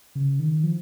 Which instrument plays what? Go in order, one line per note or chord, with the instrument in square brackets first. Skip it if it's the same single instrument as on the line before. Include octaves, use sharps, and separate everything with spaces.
[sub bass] C#3
D#3
F3